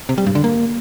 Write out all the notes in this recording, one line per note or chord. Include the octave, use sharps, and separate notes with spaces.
C3
G3
G2
D3
A#3